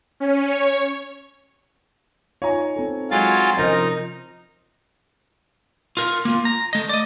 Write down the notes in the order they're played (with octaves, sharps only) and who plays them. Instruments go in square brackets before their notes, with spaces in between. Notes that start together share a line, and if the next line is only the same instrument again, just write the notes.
[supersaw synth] C#4
C#5
[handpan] D#4 F4 [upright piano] C#5 G#5 A#5
[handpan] C4 A4
[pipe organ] F#3 F4 A6 [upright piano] G#3 [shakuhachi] G#5
[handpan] C3 F3 C#4 [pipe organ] D#4 [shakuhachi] A#4 [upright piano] C5 D#5
[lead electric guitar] F4 A#4
A#3 F4
A#5
A3 D#5
D5 D#5